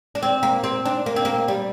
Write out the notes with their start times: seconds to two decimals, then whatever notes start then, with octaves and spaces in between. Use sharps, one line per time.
0.15 D4
0.22 C4
0.43 A#3
0.64 C4
0.85 D4
1.06 A#3
1.16 C4
1.25 A#3
1.48 G3